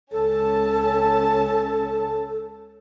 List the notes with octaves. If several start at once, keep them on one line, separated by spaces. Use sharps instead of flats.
C#2 C#4 A4 A5